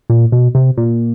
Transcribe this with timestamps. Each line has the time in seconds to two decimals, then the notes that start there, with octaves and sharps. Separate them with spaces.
0.10 A#2
0.32 B2
0.55 C3
0.77 A#2